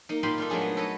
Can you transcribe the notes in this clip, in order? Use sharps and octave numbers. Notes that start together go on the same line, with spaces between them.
A#3 D#4
A#2 D#4 F4 G4 B5 C6
G3 F4 A4
F#3 G#3 A3 D4 G#4
B3
A4 B4 C#5 D#5